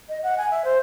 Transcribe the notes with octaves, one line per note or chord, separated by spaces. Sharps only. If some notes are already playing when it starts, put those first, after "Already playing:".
D#5
F#5
G#5
E5
C5